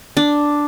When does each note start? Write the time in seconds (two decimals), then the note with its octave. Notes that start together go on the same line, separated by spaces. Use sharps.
0.17 D4